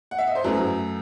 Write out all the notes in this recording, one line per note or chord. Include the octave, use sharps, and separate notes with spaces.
F#5
E5
D#5
C5
F#2 F#3 A3 B4